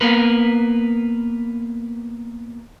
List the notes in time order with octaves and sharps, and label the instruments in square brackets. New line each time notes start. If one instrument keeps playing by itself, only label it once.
[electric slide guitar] A#3 B3 A#4 B4